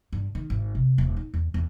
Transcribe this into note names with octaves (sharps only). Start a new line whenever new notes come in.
G2
D#3
G#1
C3
D#1
D#4
E2
E2